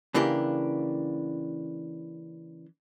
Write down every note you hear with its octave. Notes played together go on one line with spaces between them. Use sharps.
C#3 E3 A#3 D4 G4